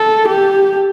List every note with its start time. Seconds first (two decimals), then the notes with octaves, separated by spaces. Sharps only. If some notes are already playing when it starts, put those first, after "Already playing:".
Already playing: A4
0.28 G4